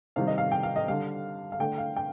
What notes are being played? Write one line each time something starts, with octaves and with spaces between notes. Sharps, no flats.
C3 D#3 G3 F5
D#5
F5
G5
F5
D#5
D3 G3 F5
F5
D3 A3 G5
F5
G5